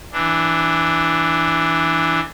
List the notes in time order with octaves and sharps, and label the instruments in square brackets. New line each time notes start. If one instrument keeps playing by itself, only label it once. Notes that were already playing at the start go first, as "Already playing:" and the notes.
[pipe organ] E3 D4